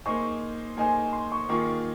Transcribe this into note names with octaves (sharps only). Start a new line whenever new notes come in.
A#3 D#4 G#4 C5 C#6
A#3 D#4 G#4 C5 G#5
C6
C#6
D#3 A#3 F4 G#4 C#6